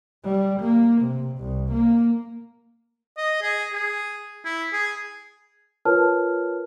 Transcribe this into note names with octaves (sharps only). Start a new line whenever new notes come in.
G3
A#3
C3
C2
A#3
D#5
G#4
G#4
E4
G#4
F4 A#4 B4 C#5 A5 F6